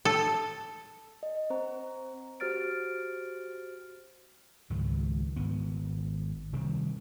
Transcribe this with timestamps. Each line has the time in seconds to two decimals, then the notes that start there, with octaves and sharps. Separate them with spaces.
0.05 A4
1.23 D#5
1.50 C4 C5 A#5
2.40 F#4 G4 C5 F6 A6 D7
4.70 C#2 G#2 D#3 F#3
5.36 G#1 B3
6.53 C3 D#3 G3 C4